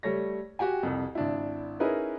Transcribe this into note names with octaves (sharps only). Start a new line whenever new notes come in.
G3 A3 C#5 A#6
F#4 G4 G5 G#5
C2 F2
G#1 D4 E4
C#4 D#4 E4 G#4 A#4 B4